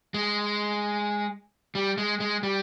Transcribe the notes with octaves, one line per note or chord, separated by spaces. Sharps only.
G#3
G3
G#3
G#3
G3